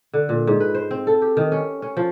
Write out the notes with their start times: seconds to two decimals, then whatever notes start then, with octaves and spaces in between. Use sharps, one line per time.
0.13 D3
0.29 A#2
0.47 G#2
0.60 B4
0.75 C5
0.91 C4
1.07 A4
1.22 G4
1.37 D#3
1.52 C#4
1.82 C#4
1.97 F3